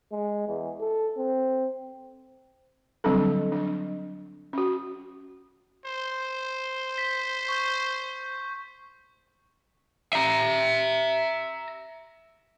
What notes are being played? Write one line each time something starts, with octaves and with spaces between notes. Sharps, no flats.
G#3
E2
A4
C4
D3 F#3 G3 C4 D4 A4
F#3 D4
C#4 F#4
C5
B6
C#6 G6
E5 A#5